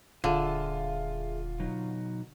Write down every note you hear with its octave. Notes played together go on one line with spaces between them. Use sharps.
D#1 D3 F4 G#4 E5
B2 F#3 D#4